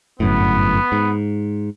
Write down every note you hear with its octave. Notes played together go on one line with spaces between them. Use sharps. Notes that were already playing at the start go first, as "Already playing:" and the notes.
G1 F#2 A2 B3
G#2